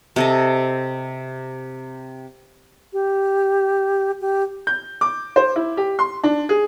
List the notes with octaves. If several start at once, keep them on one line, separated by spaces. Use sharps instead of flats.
C3 A4 D#5
G4
G4
G6
D6
C5
E4
G4
C6
D4
G#4